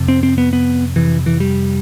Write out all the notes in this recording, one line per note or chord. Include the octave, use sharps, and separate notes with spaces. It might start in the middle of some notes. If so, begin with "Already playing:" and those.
Already playing: F2 C3
C4
C4
B3
B3
F2 C3 E3
E3
G3